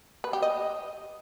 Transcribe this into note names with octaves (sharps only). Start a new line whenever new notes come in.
B4
G4
D#5